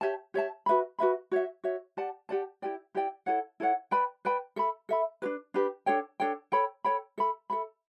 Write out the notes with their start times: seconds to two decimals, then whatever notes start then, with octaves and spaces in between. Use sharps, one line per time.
0.01 G4 C#5 E5 A5
0.34 G4 C#5 E5 A5
0.66 F#4 B4 E5 B5
0.99 F#4 B4 E5 B5
1.31 F#4 C#5 E5
1.64 F#4 C#5 E5
1.97 G4 D5 F#5 A5
2.29 G4 D5 F#5 A5
2.62 E4 G4 D5 G5
2.95 E4 G4 D5 G5
3.26 E4 A4 C#5 F#5
3.60 E4 A4 C#5 F#5
3.91 B4 D5 G5 B5
4.25 B4 D5 G5 B5
4.56 A4 E5 B5
4.89 A4 E5 B5
5.22 D4 G4 B4
5.54 D4 G4 B4
5.86 D4 A4 C#5 G5
6.20 D4 A4 C#5 G5
6.52 A4 C#5 G5 B5
6.84 A4 C#5 G5 B5
7.18 A4 E5 B5
7.50 A4 E5 B5